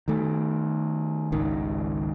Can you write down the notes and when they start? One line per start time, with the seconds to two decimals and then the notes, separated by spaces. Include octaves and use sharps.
0.08 D#3 A3
1.32 G#1 C#2 D#3